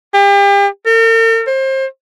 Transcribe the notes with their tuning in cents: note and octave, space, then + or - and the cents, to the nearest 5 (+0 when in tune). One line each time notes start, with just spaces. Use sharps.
G4 +35
A#4 -45
C5 +30